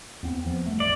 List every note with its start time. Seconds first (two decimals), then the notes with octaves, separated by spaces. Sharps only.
0.23 E2 B3 C4
0.46 E3 F3 B3
0.66 E1 G2 A3
0.80 A1 D5